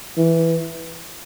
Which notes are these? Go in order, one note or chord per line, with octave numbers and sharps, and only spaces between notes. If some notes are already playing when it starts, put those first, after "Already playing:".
E3